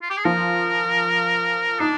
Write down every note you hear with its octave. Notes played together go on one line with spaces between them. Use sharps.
F4
G4
G#4
F3 A#4
D4 D#4